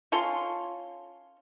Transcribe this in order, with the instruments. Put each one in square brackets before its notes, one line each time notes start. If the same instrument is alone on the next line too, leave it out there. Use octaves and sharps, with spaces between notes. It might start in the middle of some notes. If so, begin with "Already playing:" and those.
[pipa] C#4 F4 A4 C6